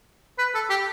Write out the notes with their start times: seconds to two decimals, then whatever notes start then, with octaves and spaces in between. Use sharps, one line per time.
0.38 B4
0.55 A4
0.70 G4